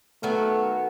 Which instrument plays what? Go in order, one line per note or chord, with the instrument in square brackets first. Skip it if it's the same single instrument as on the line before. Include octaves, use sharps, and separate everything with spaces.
[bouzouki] D#3 F#3 B3 F#4 [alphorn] A3